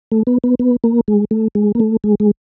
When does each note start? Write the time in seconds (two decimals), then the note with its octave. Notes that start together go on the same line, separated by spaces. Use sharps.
0.12 A3
0.27 B3
0.44 B3
0.59 B3
0.84 A#3
1.08 G#3
1.31 A3
1.55 G#3
1.75 A#3
1.80 A3
2.04 G#3
2.20 G#3